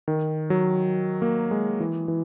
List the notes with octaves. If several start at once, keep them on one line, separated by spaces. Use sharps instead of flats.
D#3
F#3
A#3
G#3
E3
E3